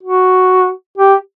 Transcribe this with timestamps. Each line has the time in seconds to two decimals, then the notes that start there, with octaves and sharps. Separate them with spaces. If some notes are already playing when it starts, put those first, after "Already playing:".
0.03 F#4
0.98 G4